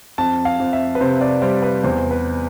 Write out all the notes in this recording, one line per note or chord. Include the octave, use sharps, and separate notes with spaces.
F2 A5
F5
F2
E5
B4
C3 C5
D5
G3 C5
B4
E2 C5
B4